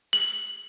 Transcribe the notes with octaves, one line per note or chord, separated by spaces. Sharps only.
F#7